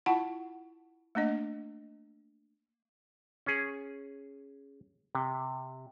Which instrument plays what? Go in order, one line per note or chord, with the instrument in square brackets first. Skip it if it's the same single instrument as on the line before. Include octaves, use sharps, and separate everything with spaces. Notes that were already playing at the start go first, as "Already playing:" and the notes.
[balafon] E4 F4 F#5 A5 C#6
A3 A#3 D4 D#5
[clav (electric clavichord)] C#4 G#4
C3